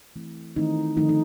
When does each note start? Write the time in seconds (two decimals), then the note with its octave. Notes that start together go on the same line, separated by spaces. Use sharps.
0.16 E3 A3 C4
0.56 D#3 E3 A3 C4 D#4
0.97 D3 D#3 F3 A3 C4 D#4
1.09 D#4